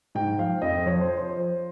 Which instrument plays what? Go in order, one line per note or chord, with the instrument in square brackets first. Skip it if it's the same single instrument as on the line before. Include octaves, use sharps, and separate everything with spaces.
[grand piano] G#2 G5
F3 F5
F2 D#5
F3 C#5
C5
C5